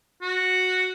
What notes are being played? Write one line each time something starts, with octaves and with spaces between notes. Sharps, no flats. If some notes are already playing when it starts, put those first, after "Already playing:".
F#4